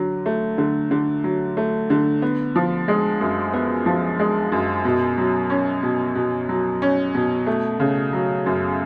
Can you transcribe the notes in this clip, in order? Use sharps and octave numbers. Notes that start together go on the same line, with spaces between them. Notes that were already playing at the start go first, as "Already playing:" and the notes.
Already playing: D3 F#3
A3
D3
D3
F#3
A3
D3
B3
F3
G#3
F#2
B3
F3
G#3
F#2
B2
F#3
C#4
B2
B2
F#3
C#4
B2
A3
C#3
F#3
F#2